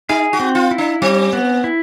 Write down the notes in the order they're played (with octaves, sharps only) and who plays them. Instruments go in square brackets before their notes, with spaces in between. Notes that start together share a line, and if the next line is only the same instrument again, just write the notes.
[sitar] D#4 [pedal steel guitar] G#4
[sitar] F#4
[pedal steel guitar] C4
[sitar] F4
[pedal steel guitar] E4
[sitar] D4
[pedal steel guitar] G3 [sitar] C4
[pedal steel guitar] B3
E4